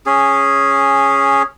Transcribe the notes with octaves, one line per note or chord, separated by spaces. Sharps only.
C#4 G#4